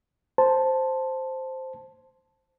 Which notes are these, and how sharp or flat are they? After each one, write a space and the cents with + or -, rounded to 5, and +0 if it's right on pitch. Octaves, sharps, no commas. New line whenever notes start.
C5 +0 A5 +0